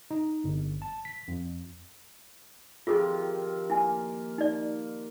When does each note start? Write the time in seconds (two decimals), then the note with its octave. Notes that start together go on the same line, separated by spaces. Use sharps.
0.11 D#4
0.44 G1
0.82 A5
1.05 B6
1.28 F2
2.87 C3 D#3 F3 F4 G#4 A4
3.70 A#3 E4 G#5
4.38 D#4 D5